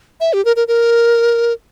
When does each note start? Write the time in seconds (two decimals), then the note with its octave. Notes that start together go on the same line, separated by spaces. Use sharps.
0.20 E5
0.33 G4
0.45 A#4
0.56 A#4
0.68 A#4